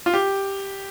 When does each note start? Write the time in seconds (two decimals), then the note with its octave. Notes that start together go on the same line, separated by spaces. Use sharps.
0.06 F4
0.14 G4